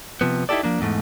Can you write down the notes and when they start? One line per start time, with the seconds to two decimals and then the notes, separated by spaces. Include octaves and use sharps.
0.21 C3 F3 B3
0.49 D#4 E4 F#4 G4 A4 D5
0.63 F3 A#3 D4
0.81 E2 G#2 A3